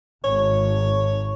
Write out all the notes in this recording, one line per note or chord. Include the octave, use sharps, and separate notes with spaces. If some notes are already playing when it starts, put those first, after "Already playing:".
G#1 C#5